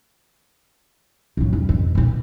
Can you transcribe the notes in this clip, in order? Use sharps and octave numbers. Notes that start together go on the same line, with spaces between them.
A2 F#3
E2 G2
F2
A#2 D3